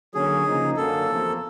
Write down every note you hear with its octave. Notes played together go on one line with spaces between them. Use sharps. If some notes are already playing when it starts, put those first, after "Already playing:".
D3 F#3 A#3 C#4 G#4
C#3 F3 A#3 D#4
F#2 D3 F#3 A#3 C#4 A4
E2 C3 F3 A#3